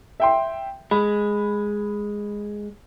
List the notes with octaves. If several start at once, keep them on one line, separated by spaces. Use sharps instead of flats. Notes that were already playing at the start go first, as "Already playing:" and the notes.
E5 G5 C6
G#3 B5